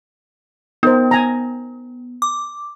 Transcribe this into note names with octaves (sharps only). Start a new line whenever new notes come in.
B3 D#4 A#4 C5
G#5 A#5
D6